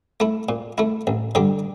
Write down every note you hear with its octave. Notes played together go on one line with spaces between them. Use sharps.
A3 E4
A#2
A3 E4
A1
G2 D3 G3 D4